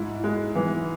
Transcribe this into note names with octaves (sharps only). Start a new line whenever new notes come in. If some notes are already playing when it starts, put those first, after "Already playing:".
Already playing: G#2 E4
G#3
E3